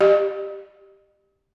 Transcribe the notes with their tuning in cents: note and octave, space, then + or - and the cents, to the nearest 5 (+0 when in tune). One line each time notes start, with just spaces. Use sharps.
G4 +0 D#5 -45